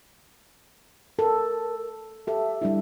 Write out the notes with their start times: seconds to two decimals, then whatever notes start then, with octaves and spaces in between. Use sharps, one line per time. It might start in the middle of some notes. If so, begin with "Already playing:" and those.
1.19 A4 A#4
2.27 G4 A4 E5
2.62 G3 D4 E4 E5